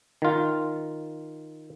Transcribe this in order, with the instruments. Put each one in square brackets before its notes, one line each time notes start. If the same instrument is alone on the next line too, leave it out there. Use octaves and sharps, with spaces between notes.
[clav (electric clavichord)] D#3 F4